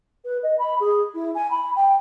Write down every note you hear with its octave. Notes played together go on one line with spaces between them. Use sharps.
B4
D#5
B5
G#4
E4
G#5
B5
G5